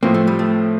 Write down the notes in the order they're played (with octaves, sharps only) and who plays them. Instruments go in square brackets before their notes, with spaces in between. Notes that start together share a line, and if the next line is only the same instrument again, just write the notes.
[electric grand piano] A2 F3 C4 [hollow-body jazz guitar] A#3
[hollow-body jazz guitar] A3
G3
A3